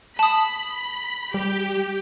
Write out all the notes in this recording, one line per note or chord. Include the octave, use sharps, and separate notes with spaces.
A5 B5 D#6
G3 G4